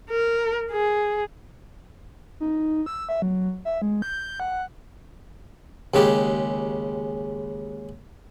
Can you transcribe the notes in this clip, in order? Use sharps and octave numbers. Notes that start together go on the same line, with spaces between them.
A#4
G#4
D#4
E6
E5
F#3
E5
G#3
G6
F#5
D#2 C#3 G#3 G4